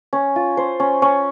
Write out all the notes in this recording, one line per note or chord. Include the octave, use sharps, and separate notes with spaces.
C#4
F4
C5
C#4
C#4